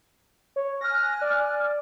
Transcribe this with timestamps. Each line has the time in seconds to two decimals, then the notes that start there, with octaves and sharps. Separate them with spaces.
0.56 C#5
0.81 G#5 F6 F#6 A#6
1.21 D5